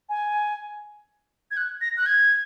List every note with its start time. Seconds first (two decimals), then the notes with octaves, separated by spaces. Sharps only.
0.09 G#5
1.51 G#6
1.57 F#6
1.81 A#6
1.97 F#6
2.06 G#6